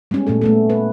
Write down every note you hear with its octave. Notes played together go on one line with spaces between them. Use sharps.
G3 G#3 B3 C#4
A#2 A3 C#4 A4
A3 B3 A4
B4